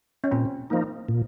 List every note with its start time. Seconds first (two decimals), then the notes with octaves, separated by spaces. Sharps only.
0.24 C#4
0.31 A#2 C4
0.70 F3 A#3 D#4
1.09 A#2